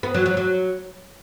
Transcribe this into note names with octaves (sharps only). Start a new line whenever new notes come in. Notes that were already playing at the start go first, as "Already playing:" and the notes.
B3
F#3
F#3
F#3